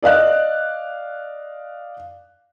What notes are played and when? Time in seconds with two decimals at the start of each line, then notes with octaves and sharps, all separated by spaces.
0.02 D5 D#5 F5 F#6